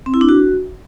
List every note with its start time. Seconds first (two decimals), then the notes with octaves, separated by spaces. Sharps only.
0.06 C4
0.14 E4
0.21 D4
0.29 F#4